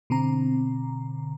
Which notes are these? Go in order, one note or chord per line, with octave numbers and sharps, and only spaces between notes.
B2 D3 C4 A#5